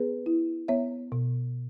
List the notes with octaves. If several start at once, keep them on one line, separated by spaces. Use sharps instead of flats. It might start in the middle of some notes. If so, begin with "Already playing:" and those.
Already playing: B3 G#4 B4
E4
B3 C#5 E5
B2